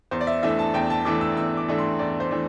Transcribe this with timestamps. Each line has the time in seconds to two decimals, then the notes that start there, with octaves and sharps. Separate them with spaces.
0.11 E2 C5
0.21 D5
0.27 E5
0.43 E3 A3 D4 E5
0.59 A5
0.74 E2 G5
0.90 A5
1.05 E3 A3 D4 D6
1.21 E6
1.37 E2 E6
1.57 D6
1.68 E3 A3 D4
1.78 C6
1.99 E2 D5
2.20 C5
2.31 E3 A3 D4